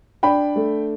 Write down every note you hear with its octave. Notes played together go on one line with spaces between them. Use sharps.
D4 G5 B5
A3